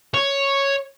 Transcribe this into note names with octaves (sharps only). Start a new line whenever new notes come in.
C#5